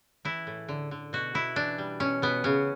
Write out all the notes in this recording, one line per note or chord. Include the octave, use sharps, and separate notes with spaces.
E3 E4
A2
D3
D3
B2 F#4
B2 E4
E3 D4
G3
B2 C#4
B2 B3
C#3 C#4